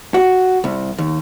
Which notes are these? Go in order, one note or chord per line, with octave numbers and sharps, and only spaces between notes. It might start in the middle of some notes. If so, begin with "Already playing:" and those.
F#4
C2
D#2